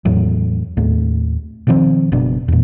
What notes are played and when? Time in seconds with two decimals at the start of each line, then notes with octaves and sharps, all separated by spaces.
0.05 E2 A2 F#3
0.77 D#2 A2 A3
1.67 B2 D#3 F3 C4
2.12 F#1 B2 D4
2.48 E2 A#2